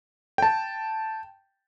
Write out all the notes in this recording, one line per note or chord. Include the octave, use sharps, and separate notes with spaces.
G5 A5